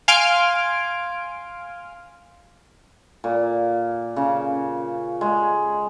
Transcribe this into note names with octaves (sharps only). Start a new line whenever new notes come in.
F5 G#5 C6 F6 D7
A#2
C#3
G#3